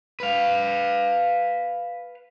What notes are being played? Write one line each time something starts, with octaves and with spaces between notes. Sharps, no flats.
B4 F5